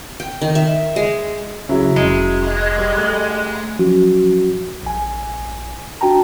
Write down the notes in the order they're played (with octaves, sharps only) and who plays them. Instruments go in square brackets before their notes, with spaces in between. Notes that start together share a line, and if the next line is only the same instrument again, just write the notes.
[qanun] G5
D#3
E5
G#3
[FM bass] C#3 [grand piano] F#3 E4 [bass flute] G#4
[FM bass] F1 [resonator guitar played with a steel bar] G#3 [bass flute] C#4
[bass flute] D#5
[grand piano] G3
[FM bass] A3
[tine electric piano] F3 F#3 C#4 F#4
A#1 G#5
D4 F#4 G5 A5 A#5